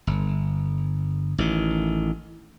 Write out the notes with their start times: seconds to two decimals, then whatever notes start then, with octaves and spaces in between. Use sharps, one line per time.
0.07 G1
1.38 A1 D#3